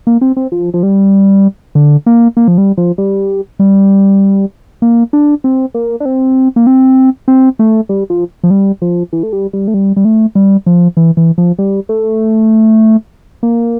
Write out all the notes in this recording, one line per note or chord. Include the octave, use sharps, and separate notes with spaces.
A#3
C4
C4
F3
F3
G3
D3
A#3
A#3
F3
G3
F3
G3
G3
A#3
D4
C4
A#3
D4
C4
A#3
C4
C4
A3
G3
F3
F3
G3
F3
E3
A3
G3
G3
A3
G3
G3
A3
G3
F3
E3
E3
F3
G3
A3
A#3